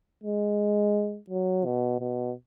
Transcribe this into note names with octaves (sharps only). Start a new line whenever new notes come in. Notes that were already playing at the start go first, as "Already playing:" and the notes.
G#3
F#3
B2
B2